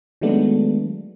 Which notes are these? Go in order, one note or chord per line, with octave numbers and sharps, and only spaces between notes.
D#3 F#3 G#3 A3 B3 D4